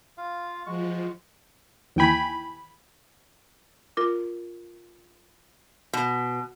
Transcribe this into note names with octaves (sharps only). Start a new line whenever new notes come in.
F4 F5
F3 G#3 F#4 C#6
D#2 E3 G5 G#5 B5
F4 A#4 D6
B2